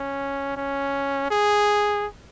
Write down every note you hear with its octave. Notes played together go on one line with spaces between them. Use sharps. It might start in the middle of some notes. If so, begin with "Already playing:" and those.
Already playing: C#4
C#4
G#4